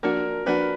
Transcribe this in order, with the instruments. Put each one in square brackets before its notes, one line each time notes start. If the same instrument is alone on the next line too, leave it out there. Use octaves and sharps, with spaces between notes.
[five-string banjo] F3 A#3 D4 F#4 [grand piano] A#4
[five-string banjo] F3 A#3 D4 F#4 [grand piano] B4